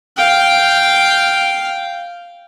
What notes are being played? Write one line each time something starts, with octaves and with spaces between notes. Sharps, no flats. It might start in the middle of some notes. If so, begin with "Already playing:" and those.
F5 G5